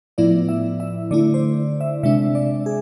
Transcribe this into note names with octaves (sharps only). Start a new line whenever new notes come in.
A2 F3 B3 E4 D5
E5
E5
D3 A3 E4 D5
C5
E5
C3 G#3 D4 E5
D5
G#4